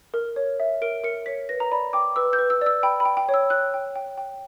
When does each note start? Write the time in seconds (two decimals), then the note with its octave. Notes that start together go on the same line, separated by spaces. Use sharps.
0.14 A#4
0.36 C#5
0.60 E5
0.82 A#4 D7
1.04 A#4 C#7
1.26 C#5 B6
1.49 B4 A#6
1.60 A#5
1.72 D5 B5
1.93 G5 D6
2.16 B4 E6
2.33 G6
2.39 B4
2.50 E6
2.61 D5 E6
2.83 G5 B5
3.00 B5
3.05 G5
3.17 G5
3.29 C#5
3.34 E6
3.50 C#5 F#6
3.74 G5
3.96 G5
4.18 G5